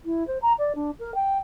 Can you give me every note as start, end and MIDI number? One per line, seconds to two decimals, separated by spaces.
0.05 0.26 64
0.27 0.38 72
0.42 0.53 82
0.58 0.72 74
0.75 0.90 62
0.99 1.14 70
1.14 1.38 79